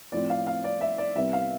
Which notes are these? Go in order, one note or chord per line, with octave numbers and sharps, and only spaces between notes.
A2 F3 C4 D5
F5
F5
D5
E5
D5
C2 C3 G3 B3 E5
F5